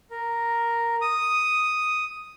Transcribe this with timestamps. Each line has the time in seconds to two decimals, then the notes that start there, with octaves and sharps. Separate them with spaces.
0.10 A#4
1.01 D#6